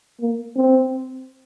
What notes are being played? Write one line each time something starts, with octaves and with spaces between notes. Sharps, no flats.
A#3
C4